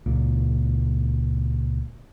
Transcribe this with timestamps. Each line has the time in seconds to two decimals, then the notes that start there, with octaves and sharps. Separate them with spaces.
0.06 C#2 A#2